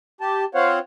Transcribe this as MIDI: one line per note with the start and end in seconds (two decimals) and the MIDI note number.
0.21 0.45 67
0.21 0.45 81
0.55 0.79 60
0.55 0.79 65
0.55 0.79 72
0.55 0.79 73
0.55 0.79 77
0.55 0.79 78